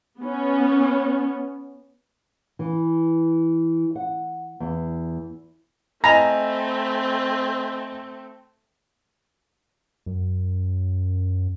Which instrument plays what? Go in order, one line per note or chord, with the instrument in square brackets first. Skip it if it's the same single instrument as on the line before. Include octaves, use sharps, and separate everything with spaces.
[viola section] B3 C#4
[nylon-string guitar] E3
F#5
E2
[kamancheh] A3 C4 [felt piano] D#5 G#5 B5 [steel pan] A#5
[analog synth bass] F#2